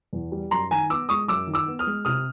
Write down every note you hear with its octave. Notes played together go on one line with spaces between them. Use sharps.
E2
G3
F#2 A#5 C6
D#3 G#5 A#5
B3 D6 E6
G#3 C#6 D#6
F#2 D6 E6
D#3
D6 E6
B3
D#6 F6
G#3
C3 D#6 F6